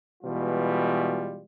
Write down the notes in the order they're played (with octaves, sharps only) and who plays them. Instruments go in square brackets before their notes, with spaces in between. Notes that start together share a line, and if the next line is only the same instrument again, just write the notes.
[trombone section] B2 E3 G3 G#3 F4